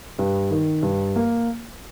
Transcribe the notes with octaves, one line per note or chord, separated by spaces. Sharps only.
G2
D#3
G2
A#3